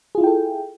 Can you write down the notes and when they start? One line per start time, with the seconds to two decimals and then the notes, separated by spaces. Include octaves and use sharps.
0.15 G#4
0.18 F4
0.21 E4
0.24 G5
0.27 A4